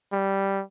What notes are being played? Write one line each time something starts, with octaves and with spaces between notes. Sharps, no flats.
G3